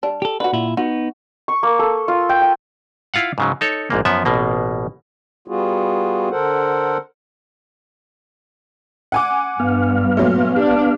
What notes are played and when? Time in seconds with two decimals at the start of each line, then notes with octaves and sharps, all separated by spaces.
0.03 G3 D4
0.22 G4 A4
0.40 D3 F#4 B4
0.53 A#2 E4 F4
0.77 B3 D#4 F#4
1.48 C#6
1.63 A#3
1.79 A4
2.08 F4
2.29 G5
2.42 G5
3.14 E4 F4 F5 F#5
3.38 G#2 C#3 F#3
3.61 D#4 A4 C#5
3.90 A#1 G#2 A#3
4.05 F#2 F3 B3 E5
4.25 A1 B2 A#3
5.48 G3 B3 F4 F#4 G#4
6.31 D3 A4 A#4 C5 F#5
9.12 F#5 G#5 D6
9.60 G2 B3 F5
10.17 A#2 F#3 A3
10.56 D4 G4